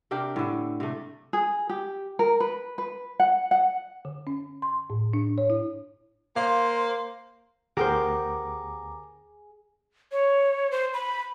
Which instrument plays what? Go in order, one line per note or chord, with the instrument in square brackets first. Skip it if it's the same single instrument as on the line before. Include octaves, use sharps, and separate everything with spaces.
[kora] C3 D4 G4 A#4
A2 D3
C3 A3
[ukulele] G#4
G4
A#4
B4
B4
F#5
F#5
[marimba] D3
C#4
C6
A2
D4
C#5
E4
[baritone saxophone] A#3 [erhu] C5 [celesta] F5
[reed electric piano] D2 A#5 D6 [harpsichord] B3 [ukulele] G4 A#4 C5 [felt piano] G#4
[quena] C#5
C5
B5